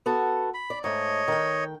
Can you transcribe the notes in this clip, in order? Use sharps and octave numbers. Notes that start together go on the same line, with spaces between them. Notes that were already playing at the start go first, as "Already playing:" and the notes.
B3 F#4 A4
B5
D5
G#2 A3 C#5 D#5
D#3 G5